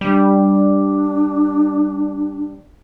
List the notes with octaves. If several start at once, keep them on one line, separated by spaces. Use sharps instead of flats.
G3 D4